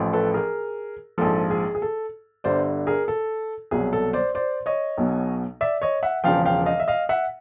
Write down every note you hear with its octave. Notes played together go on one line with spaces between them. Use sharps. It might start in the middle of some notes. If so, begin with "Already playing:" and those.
Already playing: A1 A2 F3
A4 B4
G#4 A#4
A#1 G#2 F3 A4
G#4
G#4
A4
G1 G2 D3 C5 D5
G#4 A#4
A4
C2 B2 F#3 G#4
A4
C5 D5
C5 D5
C#5 D#5
B1 B2 F#3
D5 E5
C#5 D#5
E5 F#5
E1 E2 C#3 F3 F5 G5
F5 G5
D#5 F5
E5
D#5 F5
E5 F#5